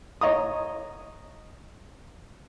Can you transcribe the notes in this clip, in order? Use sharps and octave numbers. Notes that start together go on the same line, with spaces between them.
C#5 D#5 A#5 D#6